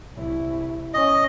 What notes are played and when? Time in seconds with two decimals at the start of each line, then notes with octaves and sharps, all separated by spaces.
0.15 C2 E4
0.94 C#4 D#5